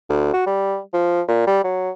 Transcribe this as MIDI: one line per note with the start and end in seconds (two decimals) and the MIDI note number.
0.09 0.30 38
0.33 0.42 66
0.46 0.78 55
0.94 1.21 53
1.28 1.45 46
1.47 1.59 55
1.64 1.90 54